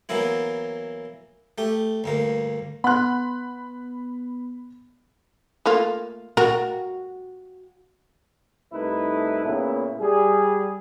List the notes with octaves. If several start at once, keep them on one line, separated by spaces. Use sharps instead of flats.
E3 F#3 A#3 B3 E4
A3 G4
D2 G2 A#3
B3 F#5 B5 C6 F#6
A3 A#3 F4
F#4 A#4
C2 A3 D#4 E4 B4
A#2 C#3 B3 E4
G3 G#4